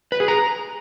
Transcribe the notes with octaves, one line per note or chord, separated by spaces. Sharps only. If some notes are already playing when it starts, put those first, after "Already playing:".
B4
G#4
A#5